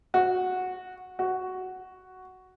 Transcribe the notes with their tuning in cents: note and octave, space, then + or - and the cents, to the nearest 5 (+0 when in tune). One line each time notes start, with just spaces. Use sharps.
F#4 -10
F#4 +5